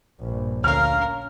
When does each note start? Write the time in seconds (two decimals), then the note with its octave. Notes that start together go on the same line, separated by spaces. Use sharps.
0.20 A#1 G2
0.64 D2 C#4 A#4 F5 F6